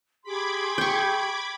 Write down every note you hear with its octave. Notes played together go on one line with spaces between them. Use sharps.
G4 G#4 B5 C6 D6 G#6
G5 C#6